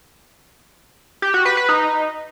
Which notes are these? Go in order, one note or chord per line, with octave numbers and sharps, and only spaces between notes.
G4
F#4
B4
B4
D#4